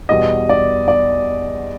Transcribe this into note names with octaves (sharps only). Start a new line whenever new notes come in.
E2 B2 G3 D#5
D5
D5